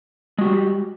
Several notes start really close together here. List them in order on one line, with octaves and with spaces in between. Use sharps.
G#3 F#4 G4 G3